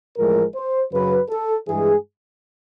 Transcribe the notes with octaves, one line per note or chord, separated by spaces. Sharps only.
A1 A2 F3 G#3 A#4
C5
F#2 C#3 F#3 B4
A4
G2 E3 G#3 G#4